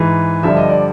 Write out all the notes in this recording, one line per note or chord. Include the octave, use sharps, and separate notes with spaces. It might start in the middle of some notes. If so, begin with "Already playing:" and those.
Already playing: G#2 E3
G2 D3 F3 E5
D#5
D5